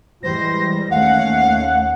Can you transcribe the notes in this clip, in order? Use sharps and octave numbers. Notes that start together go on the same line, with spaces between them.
E3 G3 G#3 C5 A#6
D#2 A3 C#4 F5 F#5